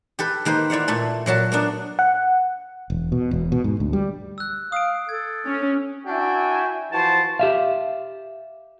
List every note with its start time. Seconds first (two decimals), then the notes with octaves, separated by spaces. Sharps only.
0.19 G4 A4 B4
0.45 D#3 A#3 B4 C5
0.70 E4 D5 F5 F#5
0.88 A#2 A3 A4
1.26 A#2 F#3 F#4 A5
1.52 A#3 B3 D4
1.99 F#5
2.90 E1
3.12 B2
3.31 E1
3.52 B2
3.64 G#2
3.80 D2
3.93 G3
4.38 E6 F#6
4.72 F5 D#6 D7
5.09 A4 G#6
5.47 C#4
6.06 D4 E4 F#4 E5 G5 G#5
6.92 E3 F3 F#4 C5 A5
7.39 G4 E5 F5